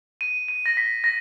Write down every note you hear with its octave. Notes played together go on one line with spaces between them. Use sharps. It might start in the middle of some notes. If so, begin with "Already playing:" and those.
D#7
D#7
A#6
B6
A#6